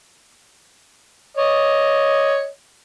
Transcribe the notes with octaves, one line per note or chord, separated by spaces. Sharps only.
C#5 D#5